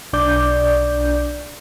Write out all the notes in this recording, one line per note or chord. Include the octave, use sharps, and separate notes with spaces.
B1 D4 D5 G6